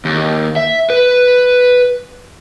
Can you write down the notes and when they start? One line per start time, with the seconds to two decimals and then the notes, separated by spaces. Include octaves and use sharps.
0.05 D#2
0.56 E5
0.90 B4